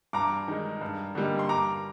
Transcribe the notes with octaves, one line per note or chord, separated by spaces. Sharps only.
G2 A#5 D6
D#3 G#3
G2
D3 G3 A#3 D#4
C6
G2 A#5 D6